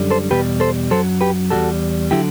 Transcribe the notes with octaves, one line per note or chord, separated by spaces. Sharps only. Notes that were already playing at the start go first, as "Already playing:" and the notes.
Already playing: F#2 D3 G3
A4 C5
E2 B2 G3 G4 B4
A4 C5
F#2 F#3 A4 C5
G4 B4
E2 B2 G3 F#4 A4
D3 F#3 E4 G4